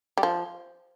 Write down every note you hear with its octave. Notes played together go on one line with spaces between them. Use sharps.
G3
F3